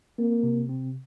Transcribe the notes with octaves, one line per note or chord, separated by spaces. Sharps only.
A#3 C4
C3
C4